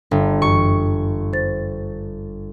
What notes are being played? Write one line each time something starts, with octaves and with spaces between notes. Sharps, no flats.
G1
F#2 E3 C#6
C5 A6